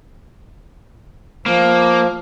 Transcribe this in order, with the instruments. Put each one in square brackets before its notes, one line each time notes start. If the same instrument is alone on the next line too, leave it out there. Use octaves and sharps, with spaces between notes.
[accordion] F3 [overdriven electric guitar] A#3